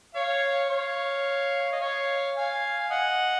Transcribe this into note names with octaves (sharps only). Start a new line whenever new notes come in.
C#5 F5
C#5 F5
D#5
C#5 F5
F5 G#5
G#5
D#5 F#5